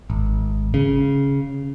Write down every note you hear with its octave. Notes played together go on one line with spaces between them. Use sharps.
G#1
C#3